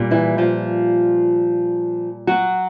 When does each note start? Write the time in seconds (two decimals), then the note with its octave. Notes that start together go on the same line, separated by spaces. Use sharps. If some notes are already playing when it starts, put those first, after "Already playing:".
Already playing: A#2 G3
0.11 E3 E4
0.38 F3 F4
2.27 F#3 F#4